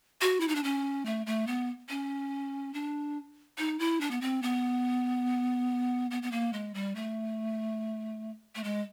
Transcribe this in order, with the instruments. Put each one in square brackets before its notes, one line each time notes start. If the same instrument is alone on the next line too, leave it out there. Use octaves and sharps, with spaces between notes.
[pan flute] F#4
E4
D#4
D4
C#4
A3
A3
B3
C#4
D4
D#4
E4
D4
B3
C4
B3
B3
B3
A#3
G#3
G3
A3
A3
G#3